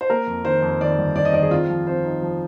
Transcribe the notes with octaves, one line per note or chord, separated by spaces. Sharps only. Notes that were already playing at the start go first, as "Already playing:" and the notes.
C5
A#3 A#4
F2
D#3 C5
F2
D#3 D5
G1
D#3 D5
D#5
D#3 D5
G#4
C4 F4
F3
C4 C5
D#4
F3